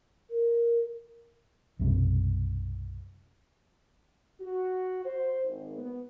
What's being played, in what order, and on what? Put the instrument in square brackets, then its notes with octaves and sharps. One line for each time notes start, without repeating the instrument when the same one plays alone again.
[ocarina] A#4
[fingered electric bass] B1 F#2 C3 G3
[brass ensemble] F#4
C5
G#1
B3